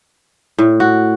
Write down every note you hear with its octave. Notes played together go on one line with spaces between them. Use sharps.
A2
F#4